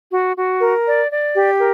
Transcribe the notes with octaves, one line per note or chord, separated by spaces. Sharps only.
F#4
F#4
A#4
D5
D5
G4
A#4